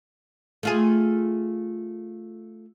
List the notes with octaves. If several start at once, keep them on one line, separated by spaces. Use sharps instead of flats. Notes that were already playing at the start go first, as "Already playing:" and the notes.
A3 F4 G#4